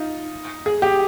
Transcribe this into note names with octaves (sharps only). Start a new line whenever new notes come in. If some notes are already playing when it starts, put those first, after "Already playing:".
Already playing: D#4 F4
G#4
G4